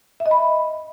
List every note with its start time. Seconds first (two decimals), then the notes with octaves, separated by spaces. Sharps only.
0.20 E5
0.26 D#5
0.31 B5